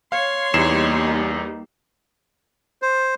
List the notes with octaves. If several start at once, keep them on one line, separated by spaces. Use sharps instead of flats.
C#5 F5 C6
E2 G3 A#3 D#4 C7 E7
C5